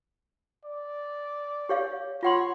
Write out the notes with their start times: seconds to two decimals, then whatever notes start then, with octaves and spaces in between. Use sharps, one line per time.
0.65 D5
1.69 G4 C#5 F5
2.23 F4 C#5 F#5 C6